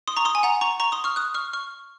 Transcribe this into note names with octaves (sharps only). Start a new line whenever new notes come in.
C6 D#6
A#5 C#6
C6 D#6
G#5
F#5 A#5
A#5 C#6
A#5 C#6
C6 D#6
C#6 F6
D#6 F#6
C#6 F6
C#6 F6